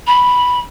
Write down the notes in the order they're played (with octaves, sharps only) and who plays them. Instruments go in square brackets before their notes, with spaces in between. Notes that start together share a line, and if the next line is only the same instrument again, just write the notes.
[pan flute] B5